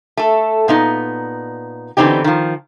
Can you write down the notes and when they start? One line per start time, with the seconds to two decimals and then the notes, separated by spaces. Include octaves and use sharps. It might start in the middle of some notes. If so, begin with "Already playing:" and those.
0.17 A3 A4
0.68 A#2 B3 D#4
1.97 D3 E3 B3 C4 D#4 G4
2.24 D#3 F3